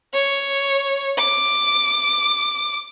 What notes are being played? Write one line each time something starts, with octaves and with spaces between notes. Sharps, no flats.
C#5
D6